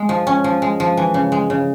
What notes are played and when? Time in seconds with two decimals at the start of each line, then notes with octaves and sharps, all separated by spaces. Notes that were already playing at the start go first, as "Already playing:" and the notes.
Already playing: G#3
0.09 F3
0.27 C#4
0.44 F3
0.62 G#3
0.80 F3
0.97 E3
1.14 C#3
1.32 G#3
1.50 C#3